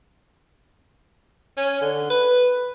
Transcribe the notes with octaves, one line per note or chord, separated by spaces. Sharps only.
C#4
D3
B4